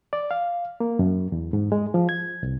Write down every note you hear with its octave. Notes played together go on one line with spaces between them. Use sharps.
D5
F5
A#3
F#2
E2
G#2
G#3
F3
G#6
C2